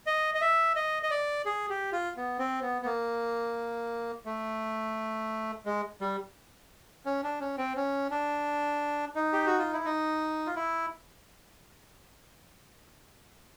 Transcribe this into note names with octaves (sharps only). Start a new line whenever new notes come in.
D#5
D#5
E5
D#5
D#5
D5
G#4
G4
F4
B3
C4
B3
B3
A#3
A3
G#3
G3
C#4
D4
C#4
C4
C#4
D4
D#4
G4
F#4
F4
E4
D#4
F4
E4